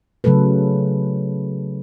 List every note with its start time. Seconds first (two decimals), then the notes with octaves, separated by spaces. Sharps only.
0.24 C#3 F#3 A3 A4 B4